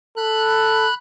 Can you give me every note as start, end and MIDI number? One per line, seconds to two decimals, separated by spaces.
0.17 0.88 69
0.17 0.94 83
0.17 0.94 90